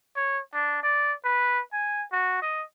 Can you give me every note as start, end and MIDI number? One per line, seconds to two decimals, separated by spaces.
0.16 0.39 73
0.53 0.80 62
0.83 1.13 74
1.24 1.60 71
1.73 2.03 80
2.12 2.42 66
2.42 2.62 75